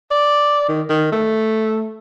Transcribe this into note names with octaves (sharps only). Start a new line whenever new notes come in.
D5
D#3
D#3
A3